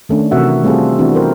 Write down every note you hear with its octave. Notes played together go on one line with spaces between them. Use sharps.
D#3 A3 C#4 D4
C3 E3 F#4 A#4 E5 F#5
G3 A3 C4 F4 G#4 A4
E3 B3 C4 D4 E4 F#4
G4 A#4 C5